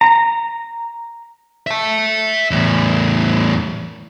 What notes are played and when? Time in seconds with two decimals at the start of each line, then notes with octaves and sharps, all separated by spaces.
0.01 A#5
1.67 E5 A5
2.51 E2 A2